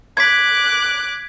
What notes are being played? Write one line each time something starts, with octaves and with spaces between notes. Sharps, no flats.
D6 F#6 G#6 B6